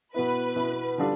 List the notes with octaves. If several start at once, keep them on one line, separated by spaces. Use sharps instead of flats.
B2 B3 E4 B4
B2 B3 E4
D3 G3 D4 F4 A4